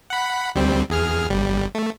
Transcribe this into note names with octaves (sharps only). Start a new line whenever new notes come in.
F#5 B5
D2 G3 C4
E2 G#4 F6
G1 G3
A3